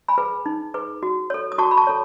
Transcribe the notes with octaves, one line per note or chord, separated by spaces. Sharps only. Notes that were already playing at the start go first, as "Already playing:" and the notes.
G#5 B5
G#4 B4
D#4
G#4 B4
F#4
A4 C#5
D#6
F#4 A5 C#6
B5
A5 C#6
A4 C#5